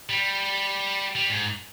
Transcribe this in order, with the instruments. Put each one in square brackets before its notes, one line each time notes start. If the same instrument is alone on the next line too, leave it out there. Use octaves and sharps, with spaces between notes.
[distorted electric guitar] G3
G3
G#2